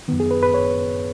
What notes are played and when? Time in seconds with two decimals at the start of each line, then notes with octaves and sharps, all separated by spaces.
0.08 F#2 D#3 B3
0.20 G#4
0.31 B4
0.43 B4
0.54 C#5